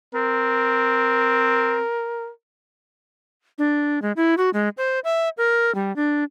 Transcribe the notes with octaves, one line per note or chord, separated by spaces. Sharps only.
C4 A#4
D4
G#3
E4
F#4
G#3
C5
E5
A#4
G3
D4